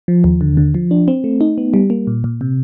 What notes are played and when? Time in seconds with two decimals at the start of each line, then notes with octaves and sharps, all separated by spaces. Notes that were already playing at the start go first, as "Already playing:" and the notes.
0.08 F3
0.24 D#2
0.41 D3
0.57 D3
0.74 F3
0.91 D4
1.08 C4
1.24 A3
1.41 D#4
1.58 B3
1.74 G3
1.90 A#3
2.07 A#2
2.24 A#2
2.41 C3